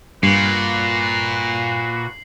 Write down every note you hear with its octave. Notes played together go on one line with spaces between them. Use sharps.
G2 A#2 F#4 B4 C7 F#7